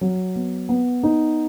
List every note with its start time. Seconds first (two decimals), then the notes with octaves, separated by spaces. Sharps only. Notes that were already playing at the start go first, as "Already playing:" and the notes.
0.01 F#3
0.35 B3
0.69 B3
1.03 D#4